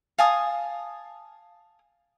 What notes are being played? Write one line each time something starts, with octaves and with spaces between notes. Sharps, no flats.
F5 G#5 A5 D#6